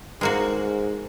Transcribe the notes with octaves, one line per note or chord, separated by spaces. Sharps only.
G#2 G#3 A#3 F#4